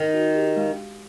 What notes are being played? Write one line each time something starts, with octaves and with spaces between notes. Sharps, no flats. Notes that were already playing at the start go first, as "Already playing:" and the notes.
Already playing: D#3 D#4
F#4
G4
G#3